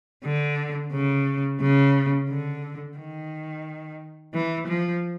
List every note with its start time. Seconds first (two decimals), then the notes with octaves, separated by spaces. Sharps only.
0.25 D3
0.93 C#3
1.61 C#3
2.29 D3
2.98 D#3
4.34 E3
4.68 F3